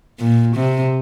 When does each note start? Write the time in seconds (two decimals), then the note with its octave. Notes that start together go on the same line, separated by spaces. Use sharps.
0.20 A#2
0.55 C3